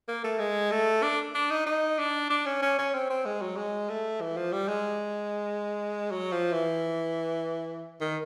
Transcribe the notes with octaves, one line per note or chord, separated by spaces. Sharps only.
A#3
A3
G#3
A3
D4
D4
D#4
D#4
D4
D4
C#4
C#4
C#4
C4
C4
G#3
F#3
G#3
A3
E3
F3
G3
G#3
F#3
F3
E3
D#3